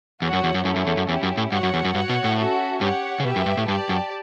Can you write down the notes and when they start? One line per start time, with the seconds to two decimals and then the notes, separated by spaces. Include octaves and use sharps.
0.22 E2 F#4 C#5 F#5
0.33 F#2
0.44 E2
0.54 F#2
0.65 F#2 A3 C#4 E4
0.76 F#2
0.87 E2
0.97 F#2
1.09 E2 C#4 E4 G4
1.23 F#2
1.37 A2
1.52 G2 F#4 C#5 F#5
1.63 F#2
1.74 E2
1.85 F#2
1.95 G2 F#4 C#5 F#5
2.09 B2
2.24 A2
2.38 C#4 F#4 A4 E5
2.81 G2 G4 C#5 F#5
3.20 C#3
3.25 B2 G4 B4 E5 G5
3.36 F#2
3.46 G2
3.57 A2
3.68 G2 G4 D5 A5
3.89 F#2